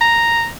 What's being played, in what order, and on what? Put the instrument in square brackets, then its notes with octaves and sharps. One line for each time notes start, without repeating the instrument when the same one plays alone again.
[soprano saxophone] A#5